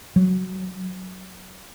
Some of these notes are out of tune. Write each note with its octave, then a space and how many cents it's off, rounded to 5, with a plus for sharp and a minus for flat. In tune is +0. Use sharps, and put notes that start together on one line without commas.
F#3 +5